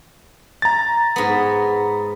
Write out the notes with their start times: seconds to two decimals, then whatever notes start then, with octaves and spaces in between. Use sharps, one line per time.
0.62 A#5 A6
1.16 G#2 B3